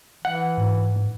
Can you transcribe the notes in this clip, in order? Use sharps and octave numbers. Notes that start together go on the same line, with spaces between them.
E3 F#5
G#2